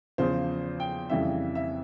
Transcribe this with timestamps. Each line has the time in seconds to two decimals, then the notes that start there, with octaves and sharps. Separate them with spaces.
0.18 E2 C#3 F3 C5
0.80 G5
1.10 F2 C#3 E3 G3 E5
1.55 E5